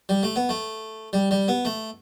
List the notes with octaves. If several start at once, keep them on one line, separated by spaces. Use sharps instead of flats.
G3
A3
B3
A3
G3
G3
B3
A3